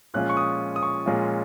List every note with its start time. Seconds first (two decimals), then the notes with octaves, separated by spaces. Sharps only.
0.14 A#2 F3 G#3 C#4 F4 F#6
0.30 C#6
0.37 D#6
0.76 D#6
0.83 C#6
1.06 A#2 F3 G#3 C#4 F4